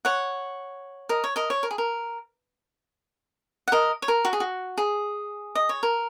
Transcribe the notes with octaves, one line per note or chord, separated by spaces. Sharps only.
C#5 F#5
A#4 D#5
C#5
A#4 D#5
C#5
A#4
G#4
A#4
F#5
A#4 D#5
C#5
A#4
F#4
G#4
F#4
G#4
D#5
C#5
A#4